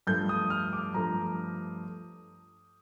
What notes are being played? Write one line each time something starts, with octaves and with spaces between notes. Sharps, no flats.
G2 F3 A3 G6
D#6
F6
D6
G2 F3 A3 A#5